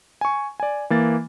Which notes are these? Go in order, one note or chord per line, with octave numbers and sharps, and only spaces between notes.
G#5 C#6
D5 G#5
E3 A#3 A6